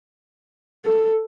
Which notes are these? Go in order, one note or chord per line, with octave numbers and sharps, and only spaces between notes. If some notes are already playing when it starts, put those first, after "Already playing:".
A4